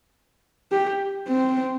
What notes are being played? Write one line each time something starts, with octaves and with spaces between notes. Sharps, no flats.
G4
C4